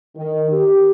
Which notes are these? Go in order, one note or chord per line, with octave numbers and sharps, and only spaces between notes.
D#3
G4